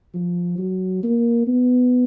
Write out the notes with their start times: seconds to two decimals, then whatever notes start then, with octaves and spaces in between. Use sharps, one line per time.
0.14 F3
0.58 F#3
1.03 A#3
1.47 B3